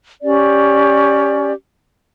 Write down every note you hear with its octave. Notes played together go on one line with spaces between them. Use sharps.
C#4 G4 D5